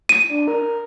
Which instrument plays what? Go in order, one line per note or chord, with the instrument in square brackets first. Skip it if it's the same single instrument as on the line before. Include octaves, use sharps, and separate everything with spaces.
[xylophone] D#7
[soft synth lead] D4
A#4